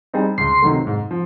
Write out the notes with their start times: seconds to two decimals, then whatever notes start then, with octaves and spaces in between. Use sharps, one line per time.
0.14 G3 C4 D#4 G#4
0.38 C#2 C6
0.62 C3 D#3 F#3 A3
0.87 G#2
1.11 F3